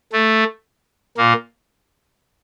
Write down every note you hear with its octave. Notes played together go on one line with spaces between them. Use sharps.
A3
A#2 A#3